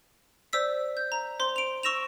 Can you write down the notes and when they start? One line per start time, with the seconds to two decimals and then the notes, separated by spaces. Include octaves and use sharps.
0.53 C5 D5 E6 B6
0.97 G6
1.12 A#5
1.40 C5 C6
1.56 D7 F7
1.83 C#6 E6 A#6 E7 F7